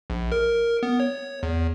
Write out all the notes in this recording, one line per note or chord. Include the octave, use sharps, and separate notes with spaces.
A#1
A#4
B3
C#5
E2